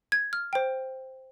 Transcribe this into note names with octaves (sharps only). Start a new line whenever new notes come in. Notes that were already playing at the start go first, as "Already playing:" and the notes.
G#6
F6
C5 G5